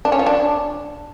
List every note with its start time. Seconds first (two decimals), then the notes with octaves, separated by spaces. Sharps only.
0.05 D4
0.12 C#4
0.19 F3
0.26 D4